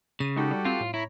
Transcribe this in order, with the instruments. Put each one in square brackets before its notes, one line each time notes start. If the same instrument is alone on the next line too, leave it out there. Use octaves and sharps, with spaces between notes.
[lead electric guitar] C#3 [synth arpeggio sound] D#7
[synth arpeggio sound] G#3 D#4 [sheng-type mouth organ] F#4 G4 A4
[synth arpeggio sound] G3
[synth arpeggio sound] C4 [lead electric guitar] F4
[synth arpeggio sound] A2
[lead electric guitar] E4 [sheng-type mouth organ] C#5 A#5 B5